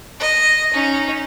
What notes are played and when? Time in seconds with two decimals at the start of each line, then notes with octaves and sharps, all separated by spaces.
0.19 D#5
0.73 C#4 D#4